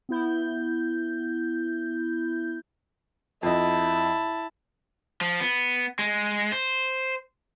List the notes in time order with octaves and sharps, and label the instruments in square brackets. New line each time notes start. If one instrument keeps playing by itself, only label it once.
[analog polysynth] B3 E4 G6
[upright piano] F2 D#5 [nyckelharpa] E4 A5
[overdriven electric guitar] F3
B3
G#3
C5